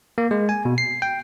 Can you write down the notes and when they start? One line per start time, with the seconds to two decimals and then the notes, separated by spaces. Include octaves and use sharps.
0.18 A#3
0.31 G#3
0.49 G#5
0.65 B2
0.78 C7
1.02 G5